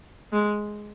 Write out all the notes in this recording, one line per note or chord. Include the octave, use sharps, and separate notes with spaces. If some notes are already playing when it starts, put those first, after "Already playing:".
G#3